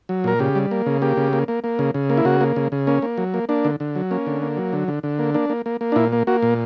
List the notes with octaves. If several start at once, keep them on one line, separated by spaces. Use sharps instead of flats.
F#3
A#2 A#4
C#3 G4
G3
A#3
C#3
A#3 G4
C#3
A#3
A#3
A#3
C#3
C#3
A#3
E4
C#3 F#4
A#3
C#3
C#3
A#3 C#4
A#3
F#3
A#3
A#3 D4
D3
D3
F#3
A#3 C#4
D3
A#3
F#3
D3
D3
D3
A#3
A#3 D4
A#3
A#3
A#3
D4
A#2 E4
A#3
A#3 F#4
A#2